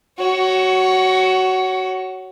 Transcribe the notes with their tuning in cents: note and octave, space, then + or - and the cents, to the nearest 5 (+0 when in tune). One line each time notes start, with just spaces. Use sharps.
F#4 +15 C#5 +0